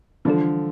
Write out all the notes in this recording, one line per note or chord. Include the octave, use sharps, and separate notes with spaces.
D3 E3 F3 G3 D4 A4